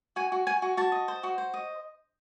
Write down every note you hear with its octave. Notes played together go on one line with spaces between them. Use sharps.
F#4 G#5
F#4
F#4 G#5
F#4
F#4 A5
D#5
C5
F#4
C5
D#5